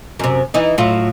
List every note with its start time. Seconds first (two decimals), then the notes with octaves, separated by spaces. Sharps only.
0.19 F#2 C3
0.54 E3 D#4
0.78 A2 F#3 F4